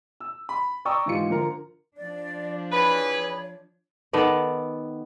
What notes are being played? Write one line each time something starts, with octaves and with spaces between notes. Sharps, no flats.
E6
B5
D5 G5 A#5 C#6 D#6 E6
G#2 E3 F4 G4 C#7
D3 F3 A#4
F3 D4 D5
E3 G#4 B4 C#5 B5
D#3 B3 A4 D5